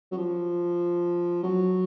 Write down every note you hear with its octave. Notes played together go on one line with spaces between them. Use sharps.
F#3
F3
F#3